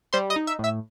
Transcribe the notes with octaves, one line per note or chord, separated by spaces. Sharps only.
G3 C5 C6
D#5 D#6
D#4
E5 E6
A2
E5 E6